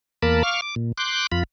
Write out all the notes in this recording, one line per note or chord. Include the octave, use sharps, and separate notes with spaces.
E2 A#3 A#4 A5 B5
F5 C#6 D6 F6
D6
A#2
C6 D6 F#6 G6
F2 F4 B5